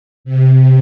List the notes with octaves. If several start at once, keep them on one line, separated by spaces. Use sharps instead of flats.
C3